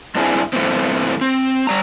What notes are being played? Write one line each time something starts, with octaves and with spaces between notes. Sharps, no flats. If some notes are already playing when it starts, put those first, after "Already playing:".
G2 C4 D4 E4 G#4
G2 C3 E3 A3 B3 C4
C4
G3 D5 A#5